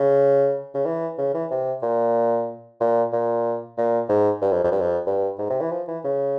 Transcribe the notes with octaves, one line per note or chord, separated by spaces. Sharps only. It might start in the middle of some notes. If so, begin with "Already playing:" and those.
Already playing: C#3
C#3
E3
C#3
E3
C3
A#2
A#2
A#2
A#2
G#2
G2
F2
F2
G2
F2
G2
G#2
C3
E3
F3
E3
C#3